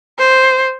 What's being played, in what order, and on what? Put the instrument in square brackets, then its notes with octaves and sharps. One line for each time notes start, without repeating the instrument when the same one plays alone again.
[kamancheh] C5